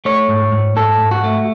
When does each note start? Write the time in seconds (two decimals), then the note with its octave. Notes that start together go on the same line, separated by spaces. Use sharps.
0.05 A3 C#5
0.28 G#2
0.52 G#2
0.76 G#2 A4
1.00 G#2
1.11 F#4
1.24 A3